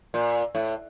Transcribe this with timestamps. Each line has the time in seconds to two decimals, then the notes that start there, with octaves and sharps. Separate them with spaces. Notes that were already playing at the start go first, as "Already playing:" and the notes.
0.14 A#2
0.55 A2